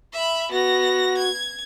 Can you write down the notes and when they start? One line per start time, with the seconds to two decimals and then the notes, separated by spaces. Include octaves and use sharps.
0.13 E5 B5
0.52 B3 F#4 A#6
1.18 G#6